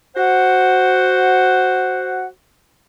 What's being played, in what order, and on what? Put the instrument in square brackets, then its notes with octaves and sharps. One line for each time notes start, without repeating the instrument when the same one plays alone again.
[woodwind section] F#4 C5 F#5